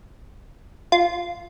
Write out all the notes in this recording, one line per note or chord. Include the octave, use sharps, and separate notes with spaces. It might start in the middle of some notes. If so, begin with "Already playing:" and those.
F4